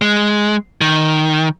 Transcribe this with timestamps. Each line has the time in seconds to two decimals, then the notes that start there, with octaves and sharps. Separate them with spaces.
0.02 G#3
0.81 D#3